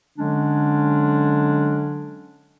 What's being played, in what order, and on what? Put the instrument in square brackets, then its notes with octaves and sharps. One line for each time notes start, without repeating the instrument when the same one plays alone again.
[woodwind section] D3 F#3 G#3 C#4 D4